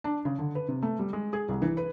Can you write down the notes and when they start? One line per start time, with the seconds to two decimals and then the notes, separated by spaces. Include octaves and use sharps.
0.04 D4
0.25 C#3
0.39 D3
0.55 B4
0.68 C3
0.83 A3
0.99 G3
1.13 G#3
1.33 G#4
1.49 C2
1.62 E3
1.77 B4